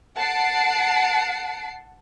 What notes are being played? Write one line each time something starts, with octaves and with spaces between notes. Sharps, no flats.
F#5 A5 C7 D7